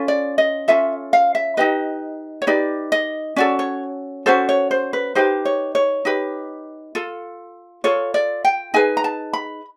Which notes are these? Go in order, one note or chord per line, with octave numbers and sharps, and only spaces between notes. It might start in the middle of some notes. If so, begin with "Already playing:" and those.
Already playing: C#4 F4 A4
D5
D#5
C#4 F4 A4 E5
F5
E5
D#4 G4 B4 D#5
C#5
D#4 G4 B4 D5
D#5
C#4 F#4 A4 D5
C#5
C#4 F#4 A4 C5
C#5
C5
B4
D#4 G4 B4 C5
C#5
C#5
D#4 G4 B4
F4 A4
F4 A4 C#5
D5
G5
D#4 G#4 B4 G#5
A#5
A5
B5